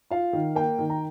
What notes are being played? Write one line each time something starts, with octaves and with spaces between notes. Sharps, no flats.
F4 F5
D#3
A#3 G5
D#3
A#5